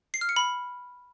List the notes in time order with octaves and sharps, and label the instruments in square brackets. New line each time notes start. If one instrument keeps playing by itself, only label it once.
[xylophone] C7
F6
C#7
B5